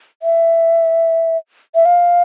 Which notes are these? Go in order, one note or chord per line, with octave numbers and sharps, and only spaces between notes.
E5
E5
F5